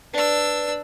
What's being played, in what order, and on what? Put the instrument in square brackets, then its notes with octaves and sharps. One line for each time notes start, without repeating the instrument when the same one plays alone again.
[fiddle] D4 E6 [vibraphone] B4 D5